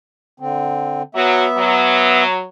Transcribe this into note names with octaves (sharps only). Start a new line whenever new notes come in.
D3 C4
F#3 B3 F#4 E5
F#3